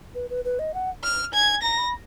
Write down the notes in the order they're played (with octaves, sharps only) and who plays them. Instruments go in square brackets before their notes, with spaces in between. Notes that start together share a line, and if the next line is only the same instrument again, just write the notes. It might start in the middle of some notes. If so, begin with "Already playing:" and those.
[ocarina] B4
B4
B4
D#5
F#5
[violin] F6
[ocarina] G#5 [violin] G#6
[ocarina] A#5 [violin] A#6
[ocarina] B5